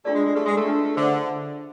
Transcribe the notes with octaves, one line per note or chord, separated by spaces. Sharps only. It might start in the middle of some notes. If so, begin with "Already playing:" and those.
A3 D4 F4 G#4 D5
G#3
G#3
A3 E4 G#4 B4
G#3
A3
D4 F4 B4
D3 C5 E5